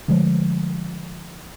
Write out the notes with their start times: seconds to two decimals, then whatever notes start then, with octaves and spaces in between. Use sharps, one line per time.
0.08 D3 F3 G#3 A3